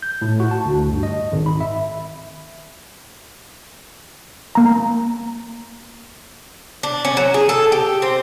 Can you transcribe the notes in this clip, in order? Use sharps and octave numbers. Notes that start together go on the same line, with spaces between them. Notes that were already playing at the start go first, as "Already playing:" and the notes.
G6
A2
F#4
A5
D2
G2
D#5
G#1
B5
E5
A#3 A#5
D4
C#4
F#3
G#4
A4
G4
C4